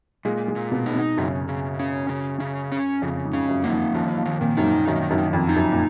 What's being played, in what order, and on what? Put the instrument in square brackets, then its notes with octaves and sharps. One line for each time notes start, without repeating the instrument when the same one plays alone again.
[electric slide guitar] A#2 [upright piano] G#3
[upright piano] G#3
[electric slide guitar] A#2
[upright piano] B2
[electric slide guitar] D#4
[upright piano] B2
[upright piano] F#2 [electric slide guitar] C#3
[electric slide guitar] C#3
C#4
C#3
C#3
C#4
[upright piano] F2 [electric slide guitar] C#3
[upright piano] G#2
[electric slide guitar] C#4
[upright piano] F#2
[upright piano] D#3 [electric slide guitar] A#3
[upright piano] F3
[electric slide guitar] D#3 [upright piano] F3
[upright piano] F3
[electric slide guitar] D#3
[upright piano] A#2
[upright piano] F#2 [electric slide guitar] D#4
[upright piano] G#2
[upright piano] F#2 [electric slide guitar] D#3
[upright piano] F#2
[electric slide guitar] D#3
[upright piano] F2
[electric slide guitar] D#4
[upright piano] F#2
A#2